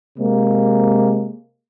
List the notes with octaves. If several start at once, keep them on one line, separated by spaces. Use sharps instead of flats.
C3 G#3 A#3